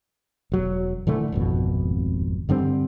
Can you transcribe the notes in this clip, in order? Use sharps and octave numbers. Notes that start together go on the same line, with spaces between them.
E1 F#3
A#2 D3 E3 A3
D#1 G#1 F2 B2
G2 D3 G3 C4